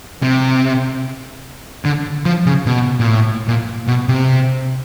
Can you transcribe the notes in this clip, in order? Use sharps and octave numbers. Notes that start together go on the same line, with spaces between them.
C3
D3
F3
C#3
B2
A#2
A2
A#2
B2
C3